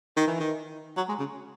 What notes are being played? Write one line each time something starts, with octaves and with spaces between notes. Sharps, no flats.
D#3
E3
D#3
F#3
G#3
C#3